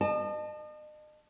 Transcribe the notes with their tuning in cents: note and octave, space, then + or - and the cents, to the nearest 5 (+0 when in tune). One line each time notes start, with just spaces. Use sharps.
D#5 -40 A5 +0